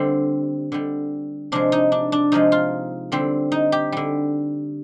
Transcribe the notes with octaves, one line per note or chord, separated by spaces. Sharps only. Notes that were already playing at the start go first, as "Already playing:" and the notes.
Already playing: D3 G3 C4
D3 G3
C3 F3 G#3 D4
D#4
D4
D4
C3 F3 G#3 D#4
F4
D3 G3 C4
D#4
G4
D3 G3